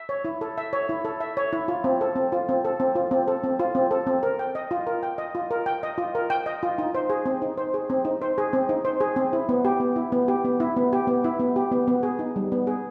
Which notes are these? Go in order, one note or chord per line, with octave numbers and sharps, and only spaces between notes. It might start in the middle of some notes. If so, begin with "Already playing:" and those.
Already playing: E5
C#5
E4
A4
E5
C#5
E4
A4
E5
C#5
E4
F4
C4
A4
C4
F4
C4
A4
C4
F4
C4
A4
C4
F4
C4
A4
C4
A#4
G5
D#5
F4
A#4
G5
D#5
F4
A#4
G5
D#5
F4
A#4
G5
D#5
F4
D#4
C5
G#4
C4
D#4
C5
G#4
C4
D#4
C5
G#4
C4
D#4
C5
G#4
C4
E4
B3
G4
B3
E4
B3
G4
B3
E4
B3
G4
B3
E4
B3
G4
B3
B3
G#4
D#4
G3
B3
G#4